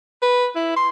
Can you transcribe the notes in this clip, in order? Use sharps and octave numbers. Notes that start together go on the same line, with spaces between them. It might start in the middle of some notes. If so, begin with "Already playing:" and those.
B4
E4
C6